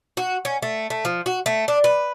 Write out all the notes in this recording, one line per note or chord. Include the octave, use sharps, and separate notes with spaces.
F#4
C#4
A3
A3
F3
F#4
A3
D4
B4